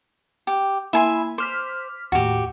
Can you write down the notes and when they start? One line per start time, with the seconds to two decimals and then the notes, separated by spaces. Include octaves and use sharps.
0.47 G4
0.93 A#3 E4 E5 G#5 B5 C6
1.38 C5 D6 F6 B6
2.12 D#2 A2 F#4 G4